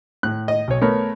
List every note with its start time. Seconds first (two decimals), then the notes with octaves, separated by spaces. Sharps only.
0.23 A2 F#6
0.48 D#5
0.68 B1 C#5
0.81 A3 B3 A#4 C#5